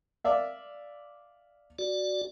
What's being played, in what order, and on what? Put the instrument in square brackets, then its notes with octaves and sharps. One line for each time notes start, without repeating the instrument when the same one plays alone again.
[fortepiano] D5 E5 F5
[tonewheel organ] F#4 D5